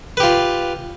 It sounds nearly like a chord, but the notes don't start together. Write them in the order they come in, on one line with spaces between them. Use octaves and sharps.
B4 G4 F4